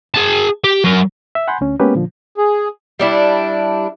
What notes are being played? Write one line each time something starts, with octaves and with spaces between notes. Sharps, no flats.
G#4 A5
G4
F#3 A#4
E5
F#5 G#5 B5 C6 G6
D2 C#4
G#3 A#3 B3 C#4 G4 B4
A#2 D3 F3
G#4
G3 D4 E4